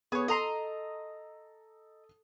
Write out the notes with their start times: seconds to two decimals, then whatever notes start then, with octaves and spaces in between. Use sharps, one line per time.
0.12 B3 G#4 C#5
0.28 A4 D#5 A#5 C6 D#6